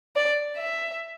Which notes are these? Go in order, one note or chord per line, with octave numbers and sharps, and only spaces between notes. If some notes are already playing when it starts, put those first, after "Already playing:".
D5
E5